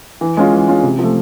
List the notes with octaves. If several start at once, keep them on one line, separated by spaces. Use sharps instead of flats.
E3
G#3 C#4 F4
E3
G#3 C#4 F4
C3
F3 A3